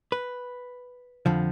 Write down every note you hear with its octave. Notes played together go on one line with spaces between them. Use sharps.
B4
F2 D3 F3